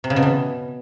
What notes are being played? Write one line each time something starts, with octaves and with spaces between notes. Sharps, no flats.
C3
C#3
B2
E3